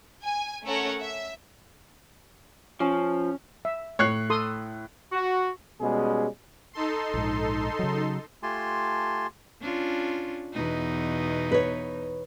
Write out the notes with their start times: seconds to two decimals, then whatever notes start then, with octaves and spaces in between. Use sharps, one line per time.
0.23 G#5
0.65 A3 C#4 A4 A#4 C#5 F#5
1.00 E5
2.80 F3 C#4
3.65 E5
3.99 A2 C#5 F#6 C7
4.30 A4 C6 D#6
5.12 F#4
5.81 B2 G3 G#3 C#4 G#4
6.73 D#4 A4 C6
7.14 A#1 G#2
7.79 C#3 F#3
8.43 A3 F4 G4 G#5 A5 C6
9.61 C#4 D4 F4
10.53 E2 B2 D#4
11.51 B4 C#5